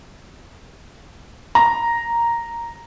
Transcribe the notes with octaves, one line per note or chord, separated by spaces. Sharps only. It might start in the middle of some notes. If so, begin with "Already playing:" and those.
A#5